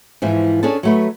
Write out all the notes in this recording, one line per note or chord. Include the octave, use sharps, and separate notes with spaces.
G#2 E3 F3
C#4 D4 G#4 A4 A5
F#3 A3 B4